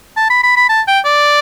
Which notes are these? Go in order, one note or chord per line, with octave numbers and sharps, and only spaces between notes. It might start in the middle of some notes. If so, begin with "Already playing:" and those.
A5
B5
B5
B5
A5
G5
D5